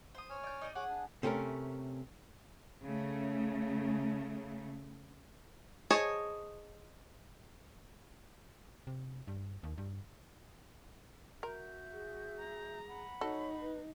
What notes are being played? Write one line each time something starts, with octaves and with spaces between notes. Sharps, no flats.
C5 D#6
C#5 G#5 F6
D5 G6
D#4 D5 D#5
G#4 C#5 F#5 G#5 D6
D4
C3 A3 C#4 A#4
C#3 A3
G#4 C5 C#5 D#5 A5
C3
G2
D#2
G2
F#4 A#4 E5 G6
G#4
A#5
F#5 B5
D#4 F#4 A4 C#5
B4